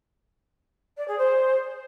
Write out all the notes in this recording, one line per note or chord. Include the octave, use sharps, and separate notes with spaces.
D5
G#4
C5